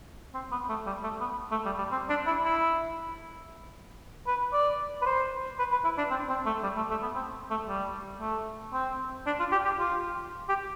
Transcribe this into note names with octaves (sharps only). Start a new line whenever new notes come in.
C4
B3
A3
G3
A3
B3
A3
G3
G3
C4
D4
E4
E4
B4
D5
B4
C5
B4
B4
E4
D4
C4
C4
A3
G3
A3
A3
B3
C4
A3
G3
A3
C4
D4
F4
G4
G4
F4
G4